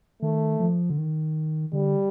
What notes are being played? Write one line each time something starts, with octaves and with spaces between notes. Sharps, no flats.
D#3 A3
F3
D3
D#3
D3 G3